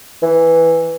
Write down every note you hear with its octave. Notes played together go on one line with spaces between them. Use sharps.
E3